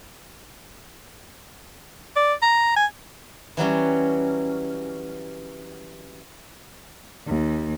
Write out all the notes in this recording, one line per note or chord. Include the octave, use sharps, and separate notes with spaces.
D5
A#5
G#5
E3 F#3 G3 C#4
D#2